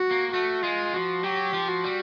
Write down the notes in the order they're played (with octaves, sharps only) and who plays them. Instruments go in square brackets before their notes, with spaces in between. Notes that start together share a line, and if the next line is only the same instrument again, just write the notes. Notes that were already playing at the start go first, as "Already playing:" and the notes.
Already playing: [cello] F#4
[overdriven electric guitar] A#3
[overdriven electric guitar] A3 [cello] F#4
[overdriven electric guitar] G#3 [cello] F4
[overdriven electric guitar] F3 [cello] F#4
[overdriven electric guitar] F#3 [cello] G4
[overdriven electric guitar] F3
[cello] F#4
[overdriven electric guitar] G3